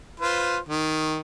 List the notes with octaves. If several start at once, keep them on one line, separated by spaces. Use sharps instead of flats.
F4 B4 C5
D#3